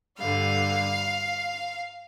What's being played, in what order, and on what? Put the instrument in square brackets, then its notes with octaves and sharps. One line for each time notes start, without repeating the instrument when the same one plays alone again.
[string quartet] G2 D3 G3 F5